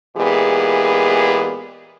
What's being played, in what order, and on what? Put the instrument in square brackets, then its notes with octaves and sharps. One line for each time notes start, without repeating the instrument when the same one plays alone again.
[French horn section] A#2 E3 G#3 B3 G4 G#4